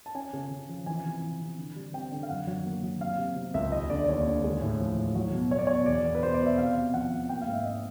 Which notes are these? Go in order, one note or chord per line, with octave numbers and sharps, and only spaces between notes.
A5
C#4 G#5
C#3
C#3
F3
E3 G#5
C3
E3
C3
D3
G3
C4 G5
D3
F5
F#2 F#5
F#3
A#3
F#3
C3 F5
C3
C3
C#2 E5
D#2 D#5
D3 D5
D5
D#2 C#5
D3
G#3
A2
F3
A2
F#3
B2
B2 C#5
D5
B2 C#5
E2 D5
B3
B4
B2 C5
D5
B2
E5
C3 F5
C3
F3 F#5
C3
A#3 G5
F5
G#2
E5
D#5